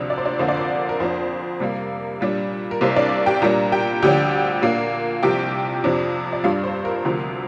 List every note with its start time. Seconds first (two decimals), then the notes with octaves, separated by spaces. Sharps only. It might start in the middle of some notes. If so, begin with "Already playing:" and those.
Already playing: D2 C3 F3 D4
0.10 D5
0.18 C5
0.25 D4 D5
0.39 F2 D3 A#3 D4 C5
0.48 D5
0.57 C5
0.89 A#4
1.00 F2 F3 D4 C5
1.60 C3 G3 A#3
2.21 A#2 G3 D4
2.71 A#4
2.81 C2 C3 G3 A#3 C5
2.96 D4 D5
3.26 G4 G5
3.42 A#2 G3 D4 A#4 A#5
3.72 G4 G5
4.02 D2 D3 F3 D4 G4 G5
4.62 A#2 A#3 D4
5.23 C2 C3 F3 G4 G5
5.84 F2 C3 F3 D4
6.33 D5
6.44 G2 G3 D4 F4 F5
6.64 C5
6.85 A#4
7.05 D2 C3 F3